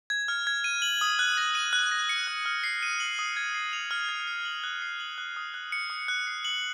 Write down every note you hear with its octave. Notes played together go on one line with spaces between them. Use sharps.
G#6
F6
G#6
D#7
F#7
D#6
F#6
A#6
D#7
F#6
A#6
C#7
F#6
F6
C7
D#7
F#7
D#6
G#6
C7
F7
F6
G#6
C7
F#7
F#6
C7
F#7
F#6
D#6
F#6
C#7
D#6
F#6
C7
F#7